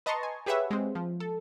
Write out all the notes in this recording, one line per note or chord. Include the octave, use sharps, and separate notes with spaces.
B4 D#5 A5 A#5 C6 C#6
G#5
G4 G#4 B4 C#5 E5 F#5
G#3 C4
F3
A4